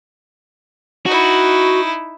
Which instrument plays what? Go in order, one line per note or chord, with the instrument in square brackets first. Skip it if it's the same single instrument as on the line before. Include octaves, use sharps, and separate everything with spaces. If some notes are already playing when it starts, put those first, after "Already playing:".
[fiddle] D#4 E4 [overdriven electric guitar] F#4